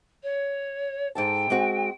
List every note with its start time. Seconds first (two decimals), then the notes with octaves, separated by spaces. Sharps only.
0.23 C#5
1.15 G#2 A4 G5 A5
1.50 G#3 C4 F#4